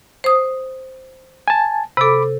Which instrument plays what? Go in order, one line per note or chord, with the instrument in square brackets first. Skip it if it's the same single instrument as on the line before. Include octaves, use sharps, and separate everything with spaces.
[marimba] C5 D#6
[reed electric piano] G#5 A5
[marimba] C3 A4 [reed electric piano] B5 D6